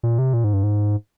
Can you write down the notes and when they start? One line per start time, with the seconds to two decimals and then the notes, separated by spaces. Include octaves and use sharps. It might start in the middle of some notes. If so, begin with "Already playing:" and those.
0.03 A#2
0.19 C3
0.34 A#2
0.44 G#2
0.53 G2
0.63 G#2